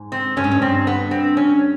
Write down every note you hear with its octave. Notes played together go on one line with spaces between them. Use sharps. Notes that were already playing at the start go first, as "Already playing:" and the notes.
Already playing: G#2
C4
G2 C#4
G#2
G2
C4
B3
C4
C#4